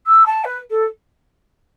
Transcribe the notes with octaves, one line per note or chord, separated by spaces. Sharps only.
E6
A5
B4
A4